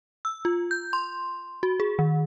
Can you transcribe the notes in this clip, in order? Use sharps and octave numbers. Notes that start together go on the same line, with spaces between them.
E6
F4
G6
C6
F#4
G#4
D#3